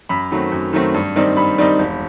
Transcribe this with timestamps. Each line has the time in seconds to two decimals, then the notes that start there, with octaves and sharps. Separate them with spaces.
0.09 F#2 B5
0.31 D#3 F#3 A3 C4
0.52 F#2
0.73 D#3 F#3 A3 C4
0.94 G2
1.16 D#3 G3 C4 D#4
1.37 G2 B5
1.58 D#3 G3 C4 D#4
1.78 E1